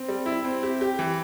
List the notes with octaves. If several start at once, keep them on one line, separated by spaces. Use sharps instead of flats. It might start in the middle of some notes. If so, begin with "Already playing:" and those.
Already playing: C4
G3
E4
C4
G4
G4
E3